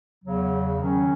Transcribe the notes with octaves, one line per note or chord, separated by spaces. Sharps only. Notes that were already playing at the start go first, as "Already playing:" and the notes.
E2 C#3 F#3
D#3 F#3 C#4